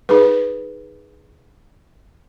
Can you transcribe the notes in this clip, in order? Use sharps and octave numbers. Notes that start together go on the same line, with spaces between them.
D#4 G#4 B4